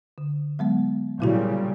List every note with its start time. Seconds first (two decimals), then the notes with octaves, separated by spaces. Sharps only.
0.18 D3
0.59 F#3 G#3 B3
1.20 A#2 C#3 F#3 G3 E4 F#4